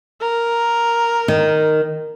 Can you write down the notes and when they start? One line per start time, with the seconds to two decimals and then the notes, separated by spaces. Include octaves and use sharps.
0.21 A#4
1.28 D#3